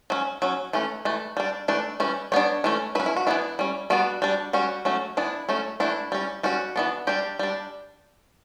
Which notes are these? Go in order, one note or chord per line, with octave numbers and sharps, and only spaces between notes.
F#3 C#4
F#3 C#4
E3 A3 C#4
E3 A3
G3 D4
E3 A3 D4
E3 G3 C#4
G3 B3 D4 C#5
E3 A3 C#4
F#3 C#4 B4
E4
F#4
E3 B3 D4 E4
G3 C#4
G3 B3 D4 F#4
G3 D4
G3 C#4 F#4
F#3 A3 C#4
E3 B3 D4 E4
F#3 A3 C#4
E3 A3 D4 E4
G3 C#4
G3 C#4 F#4
E3 B3 D4
G3 D4 G4
G3 D4